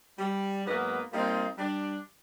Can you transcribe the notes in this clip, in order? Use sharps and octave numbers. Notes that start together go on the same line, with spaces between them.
G3
G#2 F#3 A#3 B3 B4
G3 A#3 C4 D#4 F4
G3 D4